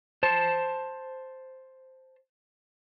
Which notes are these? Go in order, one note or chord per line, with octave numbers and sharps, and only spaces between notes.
C5 A5